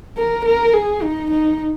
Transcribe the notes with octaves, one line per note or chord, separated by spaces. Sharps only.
A#4
A#4
G#4
D#4
D#4